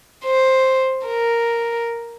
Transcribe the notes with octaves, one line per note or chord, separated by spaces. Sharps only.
C5
A#4